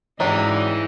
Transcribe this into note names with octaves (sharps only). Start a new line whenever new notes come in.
G#2 C#3 E3 F#3 D4 D#4 G4